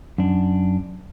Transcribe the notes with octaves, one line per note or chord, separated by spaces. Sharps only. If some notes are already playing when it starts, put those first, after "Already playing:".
F#2 D4